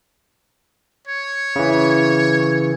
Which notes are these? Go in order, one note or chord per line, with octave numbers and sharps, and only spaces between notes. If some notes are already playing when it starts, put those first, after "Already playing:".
C#5
C#3 E3